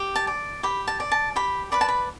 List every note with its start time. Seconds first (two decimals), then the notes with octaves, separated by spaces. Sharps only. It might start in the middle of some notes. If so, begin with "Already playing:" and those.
Already playing: G4
0.15 A5
0.27 D5
0.63 G4 B5
0.87 A5
1.00 D5
1.12 A5
1.36 G4 B5
1.72 B4 D5 B5
1.81 A5
1.89 B5